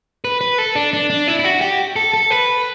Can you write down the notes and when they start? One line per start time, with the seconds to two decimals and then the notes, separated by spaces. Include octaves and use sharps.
0.24 B4
0.41 B4
0.58 A4
0.75 D4
0.93 D4
1.10 D4
1.28 E4
1.39 E4
1.44 F#4
1.61 G4
1.96 A4
2.14 A4
2.30 B4